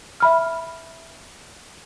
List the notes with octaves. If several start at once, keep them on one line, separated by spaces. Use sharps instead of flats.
E5 B5 F6